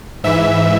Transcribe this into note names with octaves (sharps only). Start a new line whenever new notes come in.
G#2 E3 E5